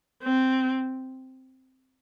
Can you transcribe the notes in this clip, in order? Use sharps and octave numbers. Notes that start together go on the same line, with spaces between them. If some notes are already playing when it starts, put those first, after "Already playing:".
C4